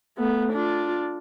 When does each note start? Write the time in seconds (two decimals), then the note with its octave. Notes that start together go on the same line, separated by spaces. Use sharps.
0.17 A3 B3
0.53 D4 F4